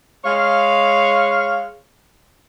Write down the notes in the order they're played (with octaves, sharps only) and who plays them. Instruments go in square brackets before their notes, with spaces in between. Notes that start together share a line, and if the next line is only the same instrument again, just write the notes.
[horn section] G#3 C#5 F5